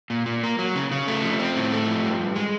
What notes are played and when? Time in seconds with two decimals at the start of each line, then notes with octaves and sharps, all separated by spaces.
0.10 A#2
0.26 A#2
0.43 A#3
0.59 F#3
0.75 C#3
0.91 C#3
1.08 A3
1.23 F3
1.39 C4
1.56 A2
1.72 A3
1.88 F3
2.04 G2
2.20 G2
2.36 G#3